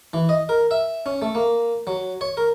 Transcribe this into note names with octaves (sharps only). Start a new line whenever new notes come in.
E3
D#5
A#4
E5
C#4
A3
A#3
F#3
C#5
A#4